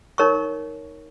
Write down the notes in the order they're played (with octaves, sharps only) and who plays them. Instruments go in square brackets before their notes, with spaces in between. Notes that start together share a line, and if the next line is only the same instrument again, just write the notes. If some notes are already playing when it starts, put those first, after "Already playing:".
[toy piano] D#4 A#4 C#5 C#6